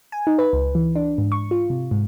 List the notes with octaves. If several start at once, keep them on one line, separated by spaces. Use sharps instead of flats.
G#5
D#4
B4
C#2
E3
D4
G#2
C#6
F4
C3
G#2